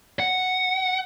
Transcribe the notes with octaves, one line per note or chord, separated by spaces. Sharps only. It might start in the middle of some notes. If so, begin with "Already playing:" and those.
F#5